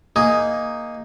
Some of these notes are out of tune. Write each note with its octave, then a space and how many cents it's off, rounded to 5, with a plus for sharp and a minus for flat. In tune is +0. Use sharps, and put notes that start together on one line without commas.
A#3 +0 D#4 +0 G#4 +0